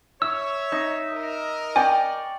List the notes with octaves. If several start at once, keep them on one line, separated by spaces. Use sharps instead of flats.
C#5 E5 E6
D#4
A#4 D#5
D5 G5 G#5 C#6